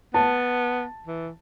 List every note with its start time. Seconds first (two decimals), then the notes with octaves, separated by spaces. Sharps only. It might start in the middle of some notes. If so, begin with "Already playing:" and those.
0.14 B3 A5
1.07 E3